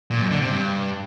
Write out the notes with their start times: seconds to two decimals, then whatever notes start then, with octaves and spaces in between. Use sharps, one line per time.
0.11 A#2
0.21 F#2
0.31 D3
0.41 C3
0.51 G2